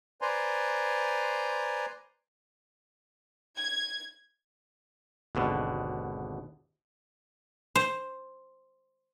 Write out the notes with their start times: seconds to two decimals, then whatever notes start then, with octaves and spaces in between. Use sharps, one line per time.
0.22 B4 C5 D5 G#5 A#5 C6
3.58 G#6
5.35 G#1 D#2 B2 D3
7.76 C5